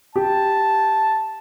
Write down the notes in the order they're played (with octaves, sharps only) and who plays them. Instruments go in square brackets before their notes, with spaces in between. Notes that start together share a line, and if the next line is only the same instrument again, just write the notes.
[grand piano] G4 [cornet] A5